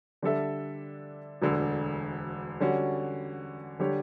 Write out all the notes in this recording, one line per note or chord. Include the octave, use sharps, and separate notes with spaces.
D3 G3 D4 A4 E5
E1 D2 D3
D3 G3 C#4 F#4
D3 G3 D4 G4 C#5